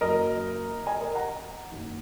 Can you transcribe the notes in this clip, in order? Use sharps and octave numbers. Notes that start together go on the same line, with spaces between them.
F#1 F#2 F#3 A#4 D#5
D#5 G#5
A#4 D#5
F#5 A#5
F#1 F#2 D#3